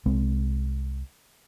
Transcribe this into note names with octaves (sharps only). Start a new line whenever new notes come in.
C2 G#3 C4